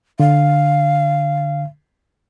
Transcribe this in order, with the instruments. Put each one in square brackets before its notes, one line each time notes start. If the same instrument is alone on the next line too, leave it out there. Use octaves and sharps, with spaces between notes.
[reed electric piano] D3 [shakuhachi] F5